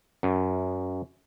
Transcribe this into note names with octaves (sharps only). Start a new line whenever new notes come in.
F#2